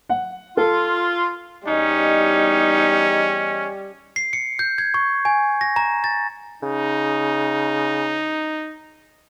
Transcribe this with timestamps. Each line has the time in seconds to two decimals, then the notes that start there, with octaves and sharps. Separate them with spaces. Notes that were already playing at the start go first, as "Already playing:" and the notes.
0.09 F#5
0.57 F4 A4
1.67 E2 G3 C#4 D#4 D#5
4.16 C7
4.33 C#7
4.59 G6
4.78 G#6
4.94 C#6
5.25 G#5
5.61 A#6
5.76 A#5
6.04 A6
6.63 C#3 D#4